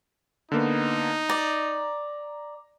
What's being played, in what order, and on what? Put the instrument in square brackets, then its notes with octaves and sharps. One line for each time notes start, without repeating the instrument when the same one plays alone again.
[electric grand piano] D3 A#3 B3 [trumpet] D#4
[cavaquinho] D5 [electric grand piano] A#5